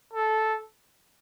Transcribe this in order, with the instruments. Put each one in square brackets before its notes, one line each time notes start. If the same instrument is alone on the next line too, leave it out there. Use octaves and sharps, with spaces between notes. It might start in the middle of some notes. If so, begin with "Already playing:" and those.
[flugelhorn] A4